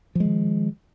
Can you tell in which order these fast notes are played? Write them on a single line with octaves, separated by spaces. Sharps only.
F3 G#3 D#3